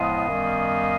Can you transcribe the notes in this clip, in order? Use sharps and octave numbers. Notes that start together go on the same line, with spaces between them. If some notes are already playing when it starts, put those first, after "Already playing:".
Already playing: A2 F3 G#3 B3 D#5 F5
F#2 D#3 G3 B3